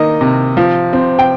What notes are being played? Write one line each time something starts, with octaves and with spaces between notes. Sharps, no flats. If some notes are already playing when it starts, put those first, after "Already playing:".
Already playing: D#3 A#3 D#5
C3
F3
C4
G5